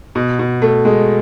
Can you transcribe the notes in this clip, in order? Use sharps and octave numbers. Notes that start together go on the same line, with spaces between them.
B2
B2
A3
G#3